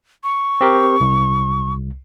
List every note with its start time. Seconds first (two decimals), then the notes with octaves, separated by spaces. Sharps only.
0.24 C#6
0.61 C4 G4 A#4
1.01 C2